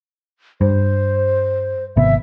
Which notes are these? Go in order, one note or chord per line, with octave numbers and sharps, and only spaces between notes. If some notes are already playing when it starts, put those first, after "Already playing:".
G2 C5
G#1 C3 B3 E5